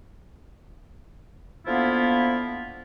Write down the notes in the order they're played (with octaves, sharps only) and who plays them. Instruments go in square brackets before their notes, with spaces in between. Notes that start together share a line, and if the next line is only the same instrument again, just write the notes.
[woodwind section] D3 F3 A#3 B3 E4 F4